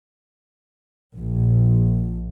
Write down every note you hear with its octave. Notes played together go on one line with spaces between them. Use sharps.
A#1